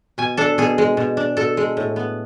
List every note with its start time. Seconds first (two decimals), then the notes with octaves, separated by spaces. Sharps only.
0.18 B2 G#5
0.37 D4 A4
0.58 B2 G#4
0.78 G#3
0.97 B2
1.17 D4
1.37 B2 A4
1.57 G#3
1.77 A2
1.96 B3